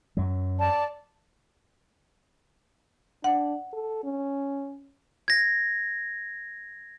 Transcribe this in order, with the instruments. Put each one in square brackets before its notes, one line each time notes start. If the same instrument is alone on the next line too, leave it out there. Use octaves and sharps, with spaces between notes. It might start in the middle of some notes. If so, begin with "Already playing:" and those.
[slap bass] F#2 F#3
[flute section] D5 A5
[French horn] D4 [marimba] F#5
[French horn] A4
C#4
[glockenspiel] G#6 A#6